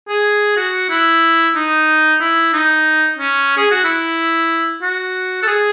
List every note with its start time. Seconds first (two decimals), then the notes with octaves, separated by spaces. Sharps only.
0.09 G#4
0.57 F#4
0.90 E4
1.56 D#4
2.21 E4
2.53 D#4
3.18 C#4
3.57 G#4
3.71 F#4
3.84 E4
4.82 F#4
5.43 A4
5.48 G#4